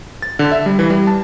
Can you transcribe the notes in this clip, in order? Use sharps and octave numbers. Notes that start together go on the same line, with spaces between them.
A6
D3
E5
G3
E3
G3
A5